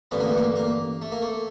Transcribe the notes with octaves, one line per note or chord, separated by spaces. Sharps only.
A1 G2 D3 B3
A#3
A3
A#3
A#3
A3
A#3
A3